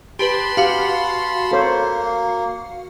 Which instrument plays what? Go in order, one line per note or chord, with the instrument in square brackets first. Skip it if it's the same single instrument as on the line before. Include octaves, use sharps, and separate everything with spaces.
[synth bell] G4 B4 [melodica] A5 B5 C6
[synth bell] F#4 F5 [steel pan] G4
[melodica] A#3 [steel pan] A4 C5 C#5